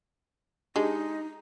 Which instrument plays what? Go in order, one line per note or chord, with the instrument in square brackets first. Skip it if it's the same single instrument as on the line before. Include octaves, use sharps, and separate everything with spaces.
[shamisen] G#3 [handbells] D4 G4 [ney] D#4